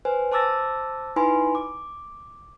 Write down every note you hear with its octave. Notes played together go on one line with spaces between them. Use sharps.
B4 C5 G#5
C5 A5 D6 E6 A6 A#6
D#4 E4 B4 G#5 B5 C6
D6